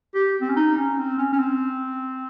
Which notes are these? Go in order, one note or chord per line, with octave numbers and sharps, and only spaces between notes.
G4
C4
C#4
D#4
C#4
C4
C#4
C#4
C4